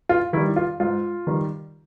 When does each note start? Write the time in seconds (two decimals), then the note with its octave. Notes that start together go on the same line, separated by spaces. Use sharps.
0.09 F4
0.33 D#3 E4
0.37 G3
0.56 F4
0.80 G#2 F4
1.27 D#3 G3